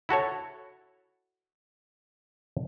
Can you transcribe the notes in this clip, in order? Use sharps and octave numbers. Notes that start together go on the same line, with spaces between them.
E4 F#4 A4 C#5